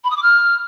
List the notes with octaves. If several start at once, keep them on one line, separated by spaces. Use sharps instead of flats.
B5
D#6
D6
F6